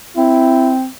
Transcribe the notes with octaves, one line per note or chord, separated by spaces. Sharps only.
C4 E4